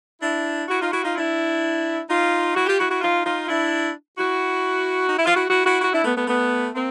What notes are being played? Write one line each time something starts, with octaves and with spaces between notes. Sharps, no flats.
D4 E4
E4 F#4
D#4 F4
E4 F#4
D#4 F4
D4 E4
D#4 F4
E4 F#4
F4 G4
E4 F#4
E4 F#4
D#4 F4
D#4 F4
D4 E4
E4 F#4
D#4
E4
F4
E4 F#4
E4 F#4
E4 F#4
E4 F#4
D4 E4
A3 B3
A3 B3
A3 B3
A#3 C4